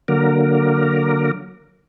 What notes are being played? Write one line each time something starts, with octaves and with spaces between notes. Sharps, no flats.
D3 F#3 A#3 A#4